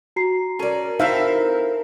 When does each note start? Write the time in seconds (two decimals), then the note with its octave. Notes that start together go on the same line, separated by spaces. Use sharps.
0.16 F#4 A#5 C7
0.59 C#4 A4 A#4 D5
1.00 C4 D#4 E4 A4 A#4 E5 F5